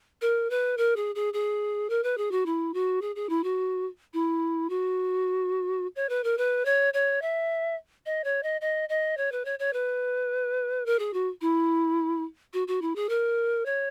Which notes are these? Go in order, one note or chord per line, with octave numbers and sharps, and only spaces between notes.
A#4
B4
A#4
G#4
G#4
G#4
A#4
B4
G#4
F#4
E4
F#4
G#4
G#4
E4
F#4
E4
F#4
C#5
B4
A#4
B4
C#5
C#5
E5
D#5
C#5
D#5
D#5
D#5
C#5
B4
C#5
C#5
B4
A#4
G#4
F#4
E4
F#4
F#4
E4
G#4
A#4
C#5